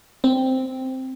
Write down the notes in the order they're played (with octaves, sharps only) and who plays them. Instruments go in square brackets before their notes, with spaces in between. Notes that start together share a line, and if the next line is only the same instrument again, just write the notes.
[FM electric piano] C4